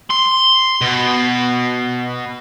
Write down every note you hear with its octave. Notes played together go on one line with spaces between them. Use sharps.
C6
B2